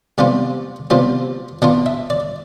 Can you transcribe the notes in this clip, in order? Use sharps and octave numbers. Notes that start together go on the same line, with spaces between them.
C3 F3 B3 F4 D5
C3 F3 B3 F4 D5
B2 B3 D4 F4 D5
E5
D5